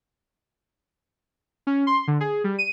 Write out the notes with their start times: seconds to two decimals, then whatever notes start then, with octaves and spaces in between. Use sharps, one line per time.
1.67 C#4
1.87 C6
2.08 D3
2.20 G#4
2.44 G3
2.59 D#7